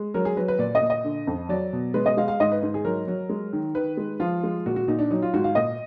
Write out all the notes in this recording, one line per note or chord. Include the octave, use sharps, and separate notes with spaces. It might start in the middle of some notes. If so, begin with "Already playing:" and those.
Already playing: G#3
F#3 A#4
G#4
F#3 B4
B4
A#2 D5
D#5
A#2
D#5
D3
F2
F#3 D5
B2
G#3 B4
D#5
G#3 F5
F5
G#2 D#5
B4
G#2
G#4
F#3 A#4
F#3
G#3
D#3
D#3 B4
G#3
F3 F4
G#3
A#2 F#4
F#4
A#2 D#4
D4
F#3 D#4
F4
G#2 F#4
F5
A#2 D#5